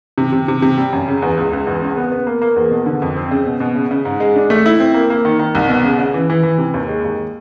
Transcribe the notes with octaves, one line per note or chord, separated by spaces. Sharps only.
C3
C3
C3
C3
G3
F#2
C#3
E2
C#2
C#2
E2
C#3
B3
B3
A#3
A#3
E2
B2
D3
F2
C4
C#3
B2
B2
C#3
C#3
G#2
G#3
D4
A3
E4
C4
A#3
A#3
D#3
D#3
C2
B2
C#3
C#3
E3
E3
E3
C3
D#2
G#3
D#2